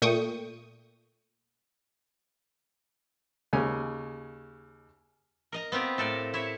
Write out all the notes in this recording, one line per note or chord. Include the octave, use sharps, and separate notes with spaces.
A#2 A3 G5 C#6 D#6
D#2 C#3 G#5
A#4 D#5 A#5
B3 C4 F4 G4
A2 A4 A#4 D5
E4 C#5 E5